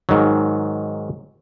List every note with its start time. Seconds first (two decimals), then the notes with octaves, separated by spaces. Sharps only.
0.09 G#2 D#3 F#3